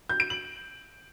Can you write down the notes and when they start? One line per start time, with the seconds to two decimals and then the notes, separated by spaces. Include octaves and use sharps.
0.09 G6
0.20 D7
0.30 F#7